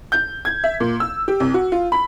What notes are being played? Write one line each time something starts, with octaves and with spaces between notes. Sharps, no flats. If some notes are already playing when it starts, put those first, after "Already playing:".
G6
G#6
E5
A#2
E6
G4
C2
F#4
F4
B5